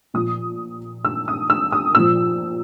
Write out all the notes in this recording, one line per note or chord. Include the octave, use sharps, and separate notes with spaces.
A#2 F3 D#6
E6
D#6
E6
D#6
A#2 F3 E6